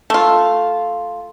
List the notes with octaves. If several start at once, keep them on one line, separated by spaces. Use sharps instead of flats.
A3 F4